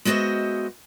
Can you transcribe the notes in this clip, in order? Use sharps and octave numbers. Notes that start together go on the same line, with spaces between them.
G#3 B3 F#4 C5 D#5 E5